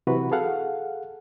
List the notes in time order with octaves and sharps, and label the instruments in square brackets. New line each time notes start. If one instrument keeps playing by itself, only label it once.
[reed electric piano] C3 E3 F#3 E4 F#4 B4
G#4 A4 F5 F#5